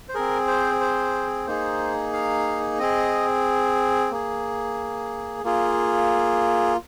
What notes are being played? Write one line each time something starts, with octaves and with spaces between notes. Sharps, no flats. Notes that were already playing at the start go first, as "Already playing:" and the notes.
C5
C4 G#4 A#4
C5
C5
A#3 D#4 G#4 C5
F5
C4 G#4 D#5
A#3 G#4
A#3 F4 G#4